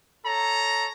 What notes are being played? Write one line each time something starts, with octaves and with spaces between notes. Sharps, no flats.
A4 C#5 A#5